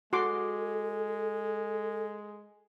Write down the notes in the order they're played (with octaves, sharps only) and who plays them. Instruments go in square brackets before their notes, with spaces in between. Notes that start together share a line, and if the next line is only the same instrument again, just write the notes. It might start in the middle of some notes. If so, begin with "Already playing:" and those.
[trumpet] G#3 [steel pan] F#4 C6 D6 [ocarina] A4